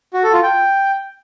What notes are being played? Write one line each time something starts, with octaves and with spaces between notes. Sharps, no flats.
F#4
A4
F4
G5